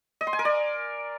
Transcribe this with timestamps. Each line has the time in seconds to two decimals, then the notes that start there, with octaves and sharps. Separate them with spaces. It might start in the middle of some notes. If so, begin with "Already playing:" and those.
0.21 D#5
0.27 C6
0.33 G#5
0.39 A#4
0.45 D5